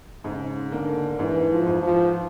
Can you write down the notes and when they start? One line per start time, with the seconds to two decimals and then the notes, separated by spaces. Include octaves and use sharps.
0.24 G#2 C#3
0.72 D3 A#3
1.19 G#2 E3
1.51 F3
1.67 G#2
1.82 F3